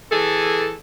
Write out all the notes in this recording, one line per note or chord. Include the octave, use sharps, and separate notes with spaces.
E3 G#4 A4